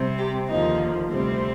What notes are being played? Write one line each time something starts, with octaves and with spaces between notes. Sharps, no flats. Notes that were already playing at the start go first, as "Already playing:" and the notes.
Already playing: C3 G3 C4
G4
D#2 D3 F3 A#3 D#4
D2 C3 G3 C4